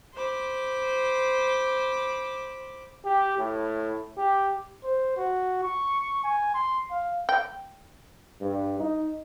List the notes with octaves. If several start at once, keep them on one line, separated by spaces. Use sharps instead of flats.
C5 B5 D6
G4
A2
G4
C5
F#4
C#6
G#5
C6
F5
G5
G2
D#4